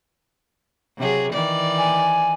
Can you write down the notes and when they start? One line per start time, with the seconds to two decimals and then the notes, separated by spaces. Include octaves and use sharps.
0.97 C3 F#3 G#4
1.33 D#3 E3 D5
1.78 G#5